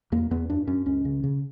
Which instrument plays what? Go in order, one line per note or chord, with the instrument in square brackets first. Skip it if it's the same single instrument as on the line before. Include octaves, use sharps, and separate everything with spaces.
[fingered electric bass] E2 A#3
E2 B3
F#2 D4
F#2 C#4
C#2 C#4
C#3
C#3